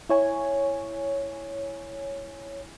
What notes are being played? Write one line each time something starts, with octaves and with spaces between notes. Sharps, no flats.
E4 C#5 G#5